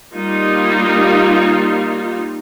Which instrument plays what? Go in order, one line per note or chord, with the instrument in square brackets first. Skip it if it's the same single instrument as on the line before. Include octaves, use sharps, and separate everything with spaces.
[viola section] G3 A#3 D#4 F4